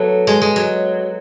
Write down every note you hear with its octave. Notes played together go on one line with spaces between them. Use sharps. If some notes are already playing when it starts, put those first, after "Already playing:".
Already playing: F#3 A3 B3
G#3
G#3
F#3